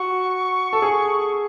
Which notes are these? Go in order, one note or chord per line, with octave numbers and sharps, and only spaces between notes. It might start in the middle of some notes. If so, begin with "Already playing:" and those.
Already playing: F#4 C#6
A4
G#4